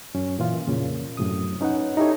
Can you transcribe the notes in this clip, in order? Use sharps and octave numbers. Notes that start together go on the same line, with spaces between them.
F#2 C#4
A#2 E3 F4
F2 A#2 C#3
F#2 A2 C3 D#6
C#4 D#4 B4 C#5 F#5
D#4 E4 G4 A4 C#5